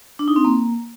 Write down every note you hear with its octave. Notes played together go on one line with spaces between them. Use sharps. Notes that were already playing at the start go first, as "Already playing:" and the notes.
D4
D#4
C4
A#3